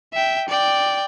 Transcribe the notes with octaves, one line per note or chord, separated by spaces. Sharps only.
E5 G5
D5 G5